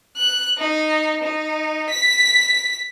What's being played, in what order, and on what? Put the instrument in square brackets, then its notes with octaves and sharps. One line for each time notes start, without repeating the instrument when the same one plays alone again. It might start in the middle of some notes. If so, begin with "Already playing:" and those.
[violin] F#6
D#4
D#4
B6